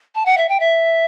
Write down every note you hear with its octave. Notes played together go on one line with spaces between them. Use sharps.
A5
F#5
E5
G5
E5